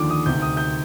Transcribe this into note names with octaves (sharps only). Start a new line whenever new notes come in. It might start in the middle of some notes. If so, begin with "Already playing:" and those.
Already playing: D#2 D3 F3 D6
D#6
D2 C3 D#3 G6
D#6
G6